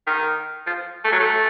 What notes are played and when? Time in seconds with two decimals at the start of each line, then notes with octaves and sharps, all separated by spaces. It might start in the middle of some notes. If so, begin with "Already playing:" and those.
0.07 D#3
0.67 F3
1.05 A3
1.12 F#3
1.20 A3